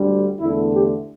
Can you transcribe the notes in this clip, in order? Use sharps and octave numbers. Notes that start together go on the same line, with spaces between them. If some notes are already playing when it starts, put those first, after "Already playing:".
Already playing: D2 D3 G3
E2 D3 A3 E4
G4